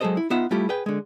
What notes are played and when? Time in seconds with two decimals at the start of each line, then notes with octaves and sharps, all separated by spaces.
0.01 F#3 G#3 G#4 A4 C5 D#5
0.17 E4
0.30 B3 D#4 F4 E5 F#5
0.51 G3 A3 E4 F4 G4
0.69 G#4 B4 G5
0.86 D3 G#3